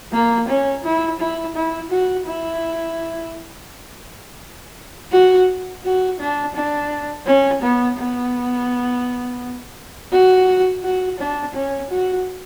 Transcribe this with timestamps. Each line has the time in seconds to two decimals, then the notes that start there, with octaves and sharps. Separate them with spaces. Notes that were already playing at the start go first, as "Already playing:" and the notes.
0.12 A#3
0.48 C#4
0.84 E4
1.20 E4
1.55 E4
1.91 F#4
2.26 E4
5.12 F#4
5.84 F#4
6.19 D4
6.55 D4
7.26 C#4
7.62 B3
7.98 B3
10.12 F#4
10.83 F#4
11.18 D4
11.55 C#4
11.90 F#4